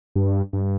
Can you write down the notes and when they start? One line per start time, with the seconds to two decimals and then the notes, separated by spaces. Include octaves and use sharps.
0.16 G2
0.53 G2